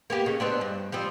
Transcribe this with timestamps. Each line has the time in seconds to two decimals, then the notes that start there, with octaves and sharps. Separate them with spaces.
0.10 A#3 B3 G4
0.26 C#3
0.40 B3 C4 D4
0.61 G2
0.92 F3 G3 C4